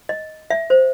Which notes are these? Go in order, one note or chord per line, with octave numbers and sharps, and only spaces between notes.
D#5
E5
C5